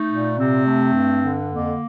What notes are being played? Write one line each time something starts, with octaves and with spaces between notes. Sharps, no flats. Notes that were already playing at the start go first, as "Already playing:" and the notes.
Already playing: A3 D#4
A#2
C3 C4
A3
G2
D3
F2 A#3